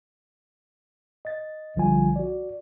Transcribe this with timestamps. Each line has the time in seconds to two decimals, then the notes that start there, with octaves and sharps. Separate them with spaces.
1.25 D#5 A6
1.76 B1 D3 F3 G3 F4 G#5
2.16 F#4 D5